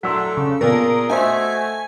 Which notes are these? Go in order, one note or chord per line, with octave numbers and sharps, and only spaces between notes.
A2 F#3 A3 D4 A4 C6 E6 B6
C#3
A#2 B3 F4 G#4 A#4 D5
A3 F#4 C5 D#5 E5 G#5